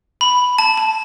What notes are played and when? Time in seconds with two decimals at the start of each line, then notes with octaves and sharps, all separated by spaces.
0.21 B5
0.59 A5
0.77 A5